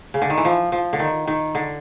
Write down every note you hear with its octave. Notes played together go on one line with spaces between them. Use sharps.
C#3
D3
D#3
E3
F3
F3
D3
D#3
D#3
D3